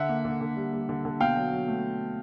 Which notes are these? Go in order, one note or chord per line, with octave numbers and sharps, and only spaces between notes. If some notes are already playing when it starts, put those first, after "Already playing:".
Already playing: D3 E5 F#5
A#3
D3
D3
G3
G3
D3
D3
B2 F5 G5
F#3
F#3
A3